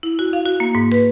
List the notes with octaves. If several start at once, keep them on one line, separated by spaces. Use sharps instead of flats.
E4
F#4
F5
F#4
A#3
G#2
B4